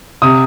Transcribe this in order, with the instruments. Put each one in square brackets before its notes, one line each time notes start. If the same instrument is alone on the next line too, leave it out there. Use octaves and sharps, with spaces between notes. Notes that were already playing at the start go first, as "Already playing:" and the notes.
[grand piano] C3 D#6